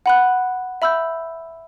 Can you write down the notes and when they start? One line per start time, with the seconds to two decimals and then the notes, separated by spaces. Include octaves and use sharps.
0.06 F#5 B5 F#6
0.82 E5 B5 E6 G6